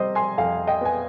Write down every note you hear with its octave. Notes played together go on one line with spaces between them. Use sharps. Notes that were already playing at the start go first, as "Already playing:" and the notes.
Already playing: C3 G3 C5 D#5
G#5 C6
F2 F5 G#5
D#5 G5
B3 G#5